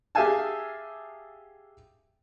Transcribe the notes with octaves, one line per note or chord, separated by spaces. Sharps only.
G4 G#4 E5 F5 G#5 A5